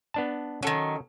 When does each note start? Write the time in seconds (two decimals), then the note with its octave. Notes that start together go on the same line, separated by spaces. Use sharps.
0.14 B3 D4 A5
0.63 D#3 F#3 C#4 A4